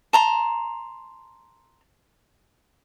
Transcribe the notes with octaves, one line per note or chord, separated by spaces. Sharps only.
A5 A#5 C6